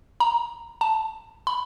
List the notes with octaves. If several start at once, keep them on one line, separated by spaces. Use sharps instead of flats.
A#5
A5
B5